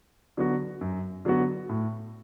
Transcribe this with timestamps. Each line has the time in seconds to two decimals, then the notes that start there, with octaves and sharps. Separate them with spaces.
0.37 D3 F#3 B3 F#4
0.81 F#2
1.25 D3 F#3 B3 F#4
1.69 A2